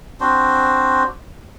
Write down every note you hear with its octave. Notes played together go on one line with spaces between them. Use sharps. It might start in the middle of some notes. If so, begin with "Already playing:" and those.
C4 D4 F#4 C5